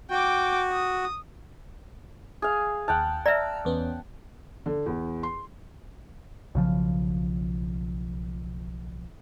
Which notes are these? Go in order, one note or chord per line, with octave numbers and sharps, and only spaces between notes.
F#4 G5 D6
D#6
G#4 F5
D#2 F#5 G5 A5 F6
D5 E5 A#5 E6 F6
E2 B3 C#4
D3
E2
C6
B1 C#3 F3